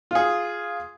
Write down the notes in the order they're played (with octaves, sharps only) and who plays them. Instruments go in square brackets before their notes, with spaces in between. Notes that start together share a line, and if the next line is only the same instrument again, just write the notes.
[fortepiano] F4 G#4